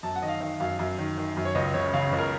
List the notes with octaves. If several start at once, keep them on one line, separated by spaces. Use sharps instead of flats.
F#2 A5
F#5
D#3 D#5
F5
D#3 F5
F#2 F5
F#2
D#3
D#3
F#2
C#5
C#2 D#5
C#3 C#5
C#3 F5
C#2
A#4